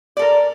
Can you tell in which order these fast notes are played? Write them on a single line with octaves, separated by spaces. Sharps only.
D5 A4 A#4